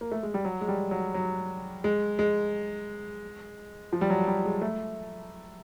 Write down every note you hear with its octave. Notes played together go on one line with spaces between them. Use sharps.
A#3
A3
G#3
G3
F#3
G#3
G3
F#3
F#3
G#3
G#3
F3
G3
F#3
G3
G#3
A3